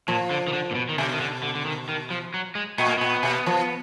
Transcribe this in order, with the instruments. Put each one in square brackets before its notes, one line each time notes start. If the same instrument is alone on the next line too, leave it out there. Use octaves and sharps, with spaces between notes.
[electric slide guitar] A#2 [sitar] F3
[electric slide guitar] D3
D#3
D3
A#2
B2
D#3
[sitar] B2 [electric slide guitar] D3
[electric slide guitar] D#3
D3
D3
D3
D#3
D#3
F3
F#3
G#3
[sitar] A#2 [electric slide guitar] B3
[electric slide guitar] A#3
[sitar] A#2 [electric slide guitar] B3
[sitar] B2
F3